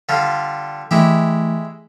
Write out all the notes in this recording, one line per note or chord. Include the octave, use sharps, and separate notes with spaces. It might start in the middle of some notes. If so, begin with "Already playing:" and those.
D3 G3 F4
E3 G#3 A3 E4 G4